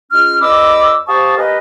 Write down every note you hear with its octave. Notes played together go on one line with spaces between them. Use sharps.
G#3 C#4 F4 F6
E2 D#5 B5 D6 E6
G4 C5 F5 A5 C#6 D#6
A#3 G4 A#4 B4 D#5 G#5